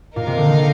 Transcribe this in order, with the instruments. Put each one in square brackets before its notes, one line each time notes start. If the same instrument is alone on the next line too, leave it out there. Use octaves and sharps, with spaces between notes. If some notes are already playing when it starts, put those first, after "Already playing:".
[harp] A#2 [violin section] D#4 A#4 F5
[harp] C3
D3
D#3